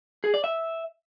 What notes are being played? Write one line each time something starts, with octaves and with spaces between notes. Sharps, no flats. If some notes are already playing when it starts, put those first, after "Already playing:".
G#4
D5
E5